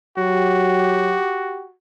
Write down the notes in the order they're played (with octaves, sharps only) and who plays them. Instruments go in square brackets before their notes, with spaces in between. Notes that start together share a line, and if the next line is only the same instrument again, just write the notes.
[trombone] F#3 [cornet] F#4 [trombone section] G4